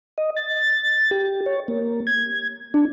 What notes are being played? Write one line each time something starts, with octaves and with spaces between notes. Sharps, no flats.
D#5
A6
G4
C#5
A#3
G#6
D4